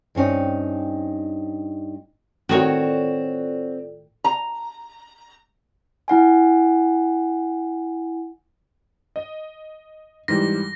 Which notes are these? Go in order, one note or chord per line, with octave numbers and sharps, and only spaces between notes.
G2 C4 C#4 D#4
A2 D#3 C4 F4 F#4 A4 C#5 D5
A#5
E4 F#5 G#5
D#5
G#2 E3 G3 A#6